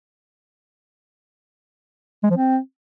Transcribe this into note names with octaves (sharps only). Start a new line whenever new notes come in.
G#3
F3
C4